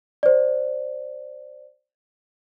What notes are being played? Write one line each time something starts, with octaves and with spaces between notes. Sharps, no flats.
C5 D5